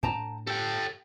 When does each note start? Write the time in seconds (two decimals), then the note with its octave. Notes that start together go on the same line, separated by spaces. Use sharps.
0.03 A2 D4 G5 A5 A#5
0.47 G4 A4 G5